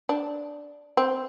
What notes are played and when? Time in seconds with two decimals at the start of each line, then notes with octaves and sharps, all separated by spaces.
0.09 D4
0.97 C4